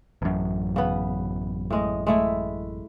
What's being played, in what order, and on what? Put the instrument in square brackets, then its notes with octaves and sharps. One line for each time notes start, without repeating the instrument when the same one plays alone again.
[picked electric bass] A1 F#2
[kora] C#3 B3
A2 G#3 D#5
G#3 A3 E4